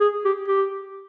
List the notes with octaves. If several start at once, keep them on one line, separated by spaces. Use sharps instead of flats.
G#4
G4
G4